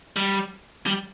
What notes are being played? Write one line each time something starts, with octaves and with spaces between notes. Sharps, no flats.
G3
G3